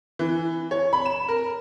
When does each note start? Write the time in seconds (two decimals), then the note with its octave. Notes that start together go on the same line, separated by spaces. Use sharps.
0.19 E3
0.71 C#5
0.93 B5
1.06 E7
1.28 A#4